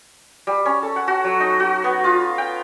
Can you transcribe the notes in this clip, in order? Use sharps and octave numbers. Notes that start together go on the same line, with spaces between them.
G3
C#4
A4
F#5
F#4
F#3
D#4
F#4
B3
F4
G5